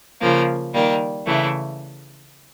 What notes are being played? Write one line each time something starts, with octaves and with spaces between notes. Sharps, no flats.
C#3 F3 A#3
D#3 G3 A#3
C#3 E3 A3